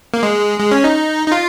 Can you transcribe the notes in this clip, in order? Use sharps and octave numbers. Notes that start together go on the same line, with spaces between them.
A#3
G#3
G#3
C#4
D#4
D#4
F4